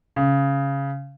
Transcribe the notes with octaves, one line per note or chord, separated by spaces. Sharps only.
C#3